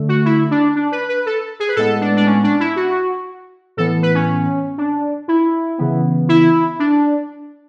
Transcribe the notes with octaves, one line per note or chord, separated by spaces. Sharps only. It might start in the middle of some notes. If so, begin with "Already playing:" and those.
Already playing: D3 A3
F#4
E4
D4
D4
B4
B4
A4
G#4
B4
A2 G#3 B3 A4
D4
D4
C#4
D4
E4
F#4
A2 E3 B3 A4
B4
C#4
D4
E4
C#3 E3 B3
E4
D4